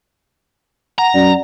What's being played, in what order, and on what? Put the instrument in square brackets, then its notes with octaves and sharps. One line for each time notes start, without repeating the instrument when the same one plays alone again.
[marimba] F#5 [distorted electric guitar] A#5
[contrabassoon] F#2 [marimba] D5